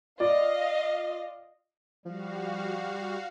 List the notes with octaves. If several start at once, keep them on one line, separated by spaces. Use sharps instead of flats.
F4 D5 D#5 F5
F3 G3 F#4 F5